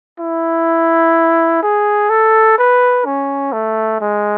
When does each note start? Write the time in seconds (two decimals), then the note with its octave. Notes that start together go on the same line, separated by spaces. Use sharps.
0.19 E4
1.63 G#4
2.10 A4
2.58 B4
3.06 C#4
3.52 A3
4.01 G#3